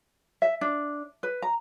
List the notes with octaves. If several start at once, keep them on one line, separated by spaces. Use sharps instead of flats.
E5
D4
B4
A#5